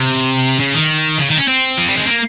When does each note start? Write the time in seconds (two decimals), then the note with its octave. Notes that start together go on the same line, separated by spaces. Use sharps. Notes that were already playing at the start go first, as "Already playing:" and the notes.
Already playing: C3
0.60 C#3
0.74 D#3
1.18 C#3
1.28 D#3
1.38 C#4
1.48 C4
1.78 F3
1.88 G3
1.97 G#3
2.07 A#3